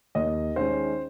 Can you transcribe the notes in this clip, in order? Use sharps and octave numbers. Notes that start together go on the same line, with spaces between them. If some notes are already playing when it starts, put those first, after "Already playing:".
D#2 D#5
D#3 G#3 C#4 C5